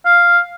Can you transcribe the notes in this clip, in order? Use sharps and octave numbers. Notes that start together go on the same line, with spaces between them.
F5